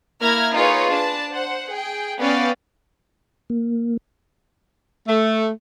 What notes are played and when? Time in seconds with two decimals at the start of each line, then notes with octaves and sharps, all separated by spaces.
0.20 A#3 E4 A#5 F6 G#6
0.53 D#4 F4 G#4 B4 C#5
0.92 D4 B4 A5
1.30 C5 F#5
1.71 G#4 G5
2.20 B3 C#4 D5 F5 G5 A6
3.50 A#3
5.08 A3